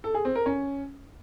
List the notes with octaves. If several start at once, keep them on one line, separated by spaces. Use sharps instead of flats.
A4
G#4
C4
A#4
C#4